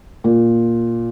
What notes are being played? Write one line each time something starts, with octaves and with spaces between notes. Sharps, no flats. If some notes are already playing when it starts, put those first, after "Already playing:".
A#2